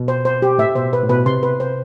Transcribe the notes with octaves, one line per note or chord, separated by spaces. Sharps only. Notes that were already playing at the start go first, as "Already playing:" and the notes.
Already playing: B2
C5
C5
G4
A2 E5
B2 C5
B4
A2
B2 B4
C3 C6
B4
C5